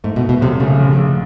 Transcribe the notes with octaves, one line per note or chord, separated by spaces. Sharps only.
G#2 A3
B2
A3
B2
B1 C3
C#3 A3
A#1
A#1